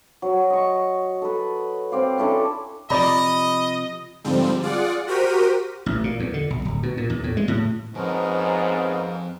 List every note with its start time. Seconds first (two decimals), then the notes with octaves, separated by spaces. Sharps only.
0.22 F#3
0.50 D#5 C#6
1.22 A4 B4
1.92 C4 D5 F5
2.18 C#4 D4 E4 A4
2.90 C3 F3 D5 D#5 A#5 B5
4.24 G#2 D3 F3 G3 C4
4.63 F4 G#4 D5 F#5
5.07 F#4 G4 A#4 C5 B6 D#7
5.86 A1
6.04 A#2
6.20 E2
6.34 D3
6.50 B1
6.65 D1
6.83 B2
6.97 A#2
7.10 E2
7.24 A2
7.37 G#3
7.48 A2
7.95 F2 G#2 F3 B3 C#4 A#4